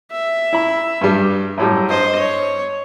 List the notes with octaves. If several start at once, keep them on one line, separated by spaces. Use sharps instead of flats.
E5
E4 B5
G2 G3
F#2 A2 G3
G2 C5 D#5
C#5